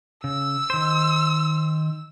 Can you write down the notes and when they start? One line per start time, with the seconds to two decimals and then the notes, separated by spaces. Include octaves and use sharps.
0.24 C#3 E6
0.70 D#3 C5